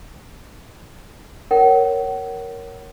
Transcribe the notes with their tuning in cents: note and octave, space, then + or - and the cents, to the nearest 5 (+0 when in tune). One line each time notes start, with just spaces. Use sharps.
A#4 +0 C#5 +0 F#5 +35